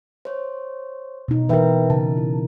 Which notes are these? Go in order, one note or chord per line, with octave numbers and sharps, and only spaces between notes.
C5 C#5
B2 D#4
E3 D#4 A#4 B4 E5 G5
C#3 A5
E4